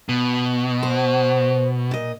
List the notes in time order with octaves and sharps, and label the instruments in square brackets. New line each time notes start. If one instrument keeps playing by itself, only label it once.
[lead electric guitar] B2
[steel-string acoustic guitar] C5
A#2 D#5